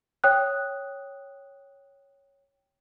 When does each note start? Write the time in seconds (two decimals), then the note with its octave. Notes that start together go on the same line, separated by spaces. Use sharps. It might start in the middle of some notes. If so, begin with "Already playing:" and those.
0.24 C#5 G5 D#6 F#6